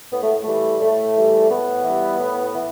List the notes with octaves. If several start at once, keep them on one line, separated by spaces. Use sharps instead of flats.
A2 B3
A3
E3 G3 A3
A2 A3
E3 G3
A2 B3
E3
G3
A2
E3